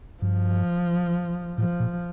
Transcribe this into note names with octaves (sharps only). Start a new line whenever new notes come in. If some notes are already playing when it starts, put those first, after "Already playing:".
G2 F3
A2 F3
A#2